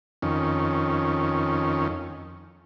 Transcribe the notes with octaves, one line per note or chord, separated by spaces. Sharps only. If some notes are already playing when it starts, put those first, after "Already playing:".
F2 D#3 C#4